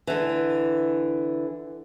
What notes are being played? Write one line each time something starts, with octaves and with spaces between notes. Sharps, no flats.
D3 E3